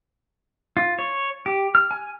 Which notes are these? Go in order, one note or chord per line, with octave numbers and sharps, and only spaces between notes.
F4
C#5
G4
F6
G#5